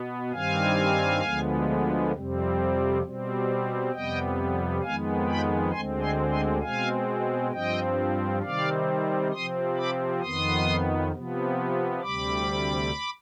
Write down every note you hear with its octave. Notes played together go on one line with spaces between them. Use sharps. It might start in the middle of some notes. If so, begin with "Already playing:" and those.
Already playing: B2 B3
G2 D#3 G3 C4 F5 G#5
D2 D3 F3 G#3 B3
F2 C3 G3 C4
B2 G3 C4
F2 C3 G3 B3 D#5 G5
F2 D#3 G#3 B3 F5 G#5
G5 B5
D2 D3 G#3 C4 G#5 C6
G#5 C6
G#5 C6
B2 G#3 C4 F5 G#5
G2 F3 C4 D#5 G5
C3 D#3 G3 C4 D5 F5
C3 F3 C4 C6 D#6
B5 D6
F2 D#3 B3 C6 D#6
C3 F3 B3
D2 C3 G3 B5 D6